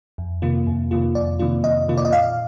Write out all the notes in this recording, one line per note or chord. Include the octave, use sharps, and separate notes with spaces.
F2
C3 D#3 A#3 F4
F2
C3 D#3 A#3 F4
F2 D5
C3 D#3 A#3 F4
F2 D#5
C3 D#3 A#3 F4
D5
D#5
A#2 F5